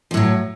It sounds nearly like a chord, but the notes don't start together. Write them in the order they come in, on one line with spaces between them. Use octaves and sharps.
F3 A2 F#3